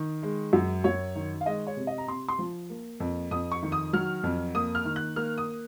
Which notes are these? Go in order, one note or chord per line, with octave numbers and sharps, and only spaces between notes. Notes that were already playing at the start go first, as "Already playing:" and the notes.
Already playing: D#3
G#3
F#2
F#2 C#5
D#3
F5
G#3 D#5
C#5
C3
D#5
A#5
C3 C6
C6
F3
A#3
F2
F2 D#6
C#6
D#3
D#6
F#3 F6
F2
A#3 D#6
F6
D#3
F#6
A#3 F6
D#6